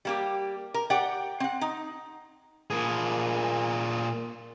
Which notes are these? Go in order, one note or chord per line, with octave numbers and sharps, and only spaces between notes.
G3 A#3 G4
A#4
G4 D5 F#5 G5
C4 F#5
D#4
A#2 G#4